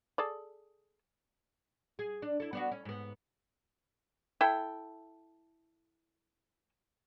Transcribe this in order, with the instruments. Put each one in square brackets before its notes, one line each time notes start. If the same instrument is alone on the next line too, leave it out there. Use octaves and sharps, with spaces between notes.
[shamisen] G#4 A4 D5
[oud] G#4
D4
E4 A4
B3 D4 F#4
C#4
G#2 B3
[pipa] E4 A4 G5